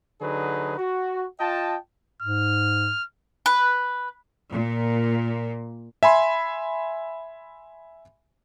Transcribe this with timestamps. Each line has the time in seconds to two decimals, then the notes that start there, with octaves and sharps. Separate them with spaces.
0.22 D3 F#3 D#4 G#4 B4
0.77 F#4
1.40 F4 D#5 G5 A5
2.22 G#2 F6
3.46 B4
4.50 A#2
6.03 E5 G#5 B5 C6